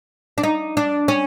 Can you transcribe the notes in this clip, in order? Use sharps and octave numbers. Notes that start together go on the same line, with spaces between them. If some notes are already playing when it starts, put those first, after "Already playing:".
D4
D#4
D4
C#4